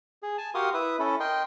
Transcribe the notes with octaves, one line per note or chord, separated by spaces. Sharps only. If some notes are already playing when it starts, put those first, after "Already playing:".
G#4
G#5 A5
F#4 G4 A#4 F5 C6 D#6
E4 B4 E5 D#6
C#4 E4 A4
A#4 D#5 G5 C6